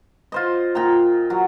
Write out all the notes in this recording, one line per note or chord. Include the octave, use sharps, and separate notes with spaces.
F4 C5 D#5
A#2 G5 A#5
F#3